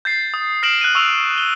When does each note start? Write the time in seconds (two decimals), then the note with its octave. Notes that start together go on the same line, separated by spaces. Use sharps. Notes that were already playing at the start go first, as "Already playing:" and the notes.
0.05 G6 A6 C7
0.34 D#6
0.63 F6 A#6 C7 D7 E7 F#7
0.81 F#6 D#7
0.95 C#6 E6 F7
1.38 G7